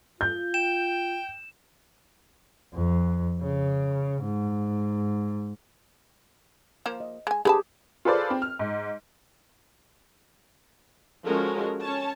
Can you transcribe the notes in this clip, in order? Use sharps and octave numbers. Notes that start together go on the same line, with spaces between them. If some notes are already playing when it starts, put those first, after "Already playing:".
F4 G6
G5 E7
F2
C#3
G#2
F3 A#3 C5
D#5
G#3 G#5
D3 G4 G#4 B4 A5
F4 G#4 A4 B4 C5 D5
C4
F6
G#2
F3 G#3 C#4 F#4 A4 A#4
C#4 C#5 A5